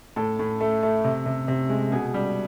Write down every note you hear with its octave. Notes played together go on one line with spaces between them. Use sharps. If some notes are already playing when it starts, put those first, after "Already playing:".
A2 A4
A2
A3
A3
C3
C3
C3
G#3
B2 G#4
G3